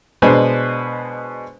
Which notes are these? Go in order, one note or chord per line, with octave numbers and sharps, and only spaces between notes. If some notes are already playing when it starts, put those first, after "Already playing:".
B2 G#3 D4 B4 C5 G#5